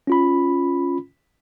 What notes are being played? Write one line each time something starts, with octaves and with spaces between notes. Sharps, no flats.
C#4 F4 B5